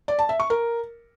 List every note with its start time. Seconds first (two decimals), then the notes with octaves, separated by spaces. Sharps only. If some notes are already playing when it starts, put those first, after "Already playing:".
0.08 D5
0.19 A5
0.29 E5
0.40 C#6
0.50 A#4